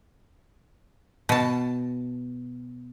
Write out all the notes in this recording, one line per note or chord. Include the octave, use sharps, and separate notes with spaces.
B2 A5